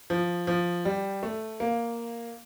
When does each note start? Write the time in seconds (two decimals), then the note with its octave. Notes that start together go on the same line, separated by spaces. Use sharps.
0.10 F3
0.47 F3
0.85 G3
1.23 A3
1.60 A#3